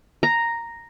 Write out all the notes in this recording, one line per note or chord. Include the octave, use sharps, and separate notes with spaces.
A#5